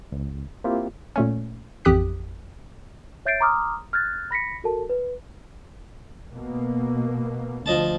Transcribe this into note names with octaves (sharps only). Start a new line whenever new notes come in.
C#2
A#3 C4 E4 F4 G4
A#2 A3 C#4
A1 F2 G4 D#6 F#6 B6
C#5 E5 G6 A6 C7 D7
A#5 C6 D6 D#6 F6
F6 F#6 G#6 A6
B5 A#6 B6 C#7
F#4 A4 A#4 A5
B4
B2 A#3
D2 F3 D#5 A5